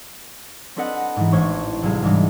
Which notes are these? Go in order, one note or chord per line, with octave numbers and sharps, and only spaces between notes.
C4 D4 A4 B4 D#5 F#5
G#2 E3
A1 D4 C5 C#5 C#6
C2 A2 F#3 G#4 F5
G#2 E3 G3 D4 D#4